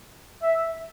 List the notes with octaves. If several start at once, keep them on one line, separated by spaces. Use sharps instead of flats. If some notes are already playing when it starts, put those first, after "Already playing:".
E5